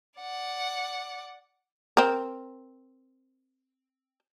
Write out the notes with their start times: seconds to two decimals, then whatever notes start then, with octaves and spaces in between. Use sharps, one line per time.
0.20 D5 F#5
1.97 C4 A#4